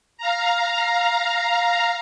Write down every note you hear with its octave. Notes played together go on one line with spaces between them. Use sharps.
F5 A#5